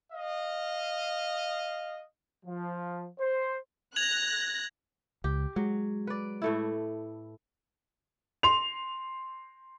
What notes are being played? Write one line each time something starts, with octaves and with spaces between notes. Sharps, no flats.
D#5 F5
F3
C5
F#6 G#6 A#6 F7 F#7
C#2 G4
F#3 G#3
B4 D5
A2 A3 E4
C6 F7